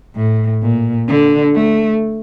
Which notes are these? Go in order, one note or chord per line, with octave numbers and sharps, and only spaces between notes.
A2
A#2
D3
A3